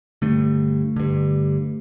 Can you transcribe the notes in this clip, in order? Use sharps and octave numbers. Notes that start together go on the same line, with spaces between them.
G2 D3 A3
G2 D3